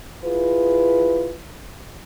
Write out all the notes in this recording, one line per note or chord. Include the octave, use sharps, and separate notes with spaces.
E4 F4 G#4 B4